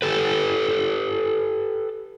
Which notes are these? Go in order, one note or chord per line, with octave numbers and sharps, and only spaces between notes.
G4 A4 B4